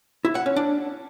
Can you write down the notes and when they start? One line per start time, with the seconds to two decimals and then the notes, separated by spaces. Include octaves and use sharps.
0.25 E4
0.35 F#5
0.46 C#4
0.56 D4